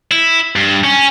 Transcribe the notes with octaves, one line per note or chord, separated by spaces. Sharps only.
E4
G2
C#4